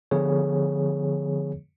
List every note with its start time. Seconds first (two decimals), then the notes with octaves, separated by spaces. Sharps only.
0.11 D3 F3 B3 G#4 C#5